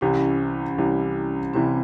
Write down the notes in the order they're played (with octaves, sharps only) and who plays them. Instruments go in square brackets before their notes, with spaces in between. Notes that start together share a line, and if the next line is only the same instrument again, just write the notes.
[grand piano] C2 C3 E3 G3 [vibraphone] C#4
[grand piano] C2 C3 E3 G3
[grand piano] C2 C3 E3 G3 [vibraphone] C4